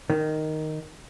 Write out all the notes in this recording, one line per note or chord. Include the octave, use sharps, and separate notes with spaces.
D#3